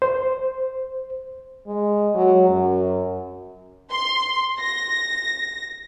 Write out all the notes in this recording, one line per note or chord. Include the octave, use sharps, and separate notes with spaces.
C5
G#3
F#3
F#2
C6
A#6